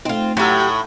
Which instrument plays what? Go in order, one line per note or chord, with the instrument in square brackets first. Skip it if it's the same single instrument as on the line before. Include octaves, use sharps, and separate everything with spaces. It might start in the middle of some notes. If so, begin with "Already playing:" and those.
[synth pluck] A3 D#4 [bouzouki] C4 F4
[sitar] A2 [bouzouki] F#3 G4 [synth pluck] F#5 A#5 E6